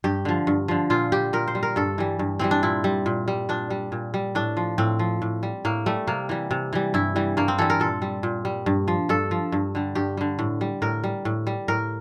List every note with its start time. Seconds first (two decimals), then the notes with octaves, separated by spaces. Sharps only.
0.04 G2 G4
0.25 D3 F3
0.47 G2
0.68 D3 F3
0.90 A#2 F4
1.12 G3 G4
1.33 A#2 A#4
1.48 C5
1.55 G3
1.63 A#4
1.76 G2 A4
1.98 E3 G3
2.19 G2
2.39 E3 G3 C4
2.51 D4
2.63 A#2 E4
2.84 G3
3.06 A#2
3.28 G3
3.49 A#2 D4
3.70 G3
3.92 A#2
4.14 G3
4.35 A2 D4
4.57 F3
4.78 A2 C4
4.99 F3
5.22 A2
5.43 G3
5.65 A2 A#3
5.86 G3 A3
6.07 C3 A#3
6.29 E3 G3
6.51 C3
6.73 E3 G3
6.94 G2 E4
7.16 E3 G3
7.37 G2 A#3
7.48 C4
7.58 E3 G3 A4
7.70 A#4
7.80 A#2 A4
8.02 G3
8.23 A#2
8.45 G3
8.66 G2
8.88 F3
9.09 G2 A4
9.31 F3
9.52 G2
9.75 D3 G3
9.95 G2 G4
10.17 D3 G3
10.39 A2
10.61 G3
10.82 A2 A#4
11.04 G3
11.25 A2
11.47 G3
11.68 A2 A#4